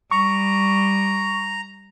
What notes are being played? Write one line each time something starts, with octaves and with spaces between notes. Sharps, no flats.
G3 A#5 C#6